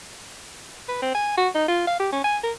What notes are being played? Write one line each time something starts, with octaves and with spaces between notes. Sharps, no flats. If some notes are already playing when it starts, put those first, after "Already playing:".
B4
C4
G#5
F#4
D#4
F4
F5
G4
C#4
G#5
A#4